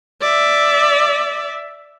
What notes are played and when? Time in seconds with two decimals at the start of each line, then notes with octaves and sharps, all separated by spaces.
0.21 D5 E5